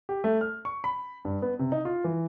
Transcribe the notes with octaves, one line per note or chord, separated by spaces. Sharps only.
G4
A3
F6
C#6
B5
G2
B3
C3
D#4
F4
E3